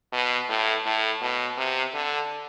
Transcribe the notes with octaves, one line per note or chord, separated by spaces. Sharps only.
B2
A2
A2
B2
C3
D3